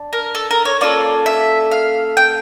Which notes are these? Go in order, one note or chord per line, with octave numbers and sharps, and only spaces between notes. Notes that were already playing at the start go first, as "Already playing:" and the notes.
Already playing: D4
A#4
A4
A#4
C#5
A#3 C#4 F4 A4 D5
E5
F5
G5